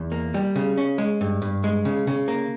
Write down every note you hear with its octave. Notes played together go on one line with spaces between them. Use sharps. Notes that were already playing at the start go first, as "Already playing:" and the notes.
Already playing: E2
A#3
G3
C#3
C#4
G#3
G2
G2
G#3
C#3
C#3
A#3